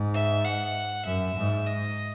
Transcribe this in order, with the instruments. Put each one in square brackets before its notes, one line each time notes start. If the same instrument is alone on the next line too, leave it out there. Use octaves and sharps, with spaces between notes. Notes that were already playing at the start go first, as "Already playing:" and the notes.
Already playing: [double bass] G#2
[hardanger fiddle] E5
F#5
[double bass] F#2 [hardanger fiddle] E5
[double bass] G#2
[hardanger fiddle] D#5